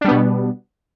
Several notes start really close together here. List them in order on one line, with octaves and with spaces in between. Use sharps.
D4 G3 B3 B2